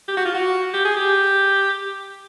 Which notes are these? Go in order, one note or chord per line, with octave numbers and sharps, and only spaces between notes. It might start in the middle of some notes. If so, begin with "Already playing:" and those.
G4
F#4
F4
F#4
G4
G#4
G4